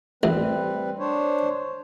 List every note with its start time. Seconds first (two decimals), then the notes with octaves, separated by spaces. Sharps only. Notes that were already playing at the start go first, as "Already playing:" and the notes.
0.23 A1 G3 C4 B4
0.99 D4 C5 C#5